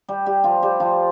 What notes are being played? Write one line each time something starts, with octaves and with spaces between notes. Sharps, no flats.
G3 G4
G3 G4
F3 F4
G3 G4
F3 F4